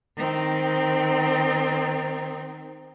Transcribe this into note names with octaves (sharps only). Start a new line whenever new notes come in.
D#3 C4